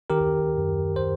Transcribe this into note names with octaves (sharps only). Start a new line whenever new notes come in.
D#3 G4 A#4
F#2
C5